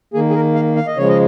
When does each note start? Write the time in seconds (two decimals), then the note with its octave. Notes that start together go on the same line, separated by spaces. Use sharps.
0.14 D#3 A#3 G#4
0.30 G#4
0.35 A#4
0.55 F5
0.76 F5
0.87 D#5
0.96 C#3 F3 G#3 C#5
1.09 D#5